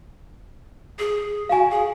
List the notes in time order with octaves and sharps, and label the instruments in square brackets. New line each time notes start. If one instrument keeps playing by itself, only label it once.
[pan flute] G#4
[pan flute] F#4 [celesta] F5 G#5
[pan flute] G#4